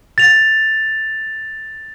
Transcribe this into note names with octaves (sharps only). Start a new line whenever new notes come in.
A6 F7